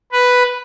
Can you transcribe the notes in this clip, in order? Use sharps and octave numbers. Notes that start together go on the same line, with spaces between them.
B4